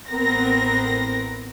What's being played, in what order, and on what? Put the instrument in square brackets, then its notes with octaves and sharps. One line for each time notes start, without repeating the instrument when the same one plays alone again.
[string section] A1 B3 C4 A#4 A#6